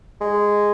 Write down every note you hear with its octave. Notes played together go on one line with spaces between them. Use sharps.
G#3